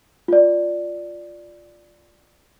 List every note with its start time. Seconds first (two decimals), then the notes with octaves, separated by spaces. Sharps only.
0.28 F4 D5